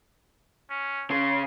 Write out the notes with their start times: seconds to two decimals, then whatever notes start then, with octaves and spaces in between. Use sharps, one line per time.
0.70 C#4
1.11 C#3 C6